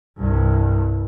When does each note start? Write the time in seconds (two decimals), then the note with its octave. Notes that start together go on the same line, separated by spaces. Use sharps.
0.17 C2 G2